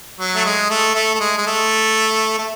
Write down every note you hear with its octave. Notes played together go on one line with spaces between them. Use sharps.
F#3
A3
G#3
A3
A3
A3
G#3
G#3
A3
A3